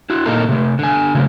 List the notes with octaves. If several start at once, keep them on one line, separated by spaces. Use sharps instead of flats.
E4 F#4
A#2 A#3 D#4 A4 A#4
C3 A3
D3 G#5
C#3 F#3 A3